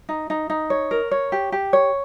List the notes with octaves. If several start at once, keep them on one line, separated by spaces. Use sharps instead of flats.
D#4
D#4
D#4
C#5
A#4
C#5
G4
G4
C#5